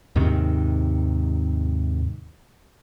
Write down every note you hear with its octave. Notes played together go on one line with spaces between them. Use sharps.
D#2 G#2 C3 D#3